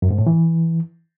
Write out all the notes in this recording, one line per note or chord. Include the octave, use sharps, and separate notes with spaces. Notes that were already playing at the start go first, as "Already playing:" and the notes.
F#2
G#2
A2
E3